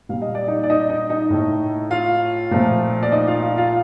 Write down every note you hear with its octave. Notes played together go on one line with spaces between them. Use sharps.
A#2 G3 F5
D#5
D5
D#4 D#5
D5
D#4 D#5
D#4 D#5
D#4 D#5
A2 A3
F4 F5
A#2 F3 A3
D5
D#4 D#5
F4 F5
F4 F5
F4 F5